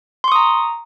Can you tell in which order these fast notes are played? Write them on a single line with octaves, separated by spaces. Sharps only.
C6 C#6 D#6 A#5